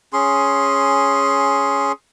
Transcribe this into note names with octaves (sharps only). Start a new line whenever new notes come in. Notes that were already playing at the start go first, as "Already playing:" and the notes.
C#4 G#4 C6